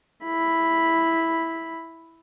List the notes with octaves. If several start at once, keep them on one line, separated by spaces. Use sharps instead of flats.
E4 B5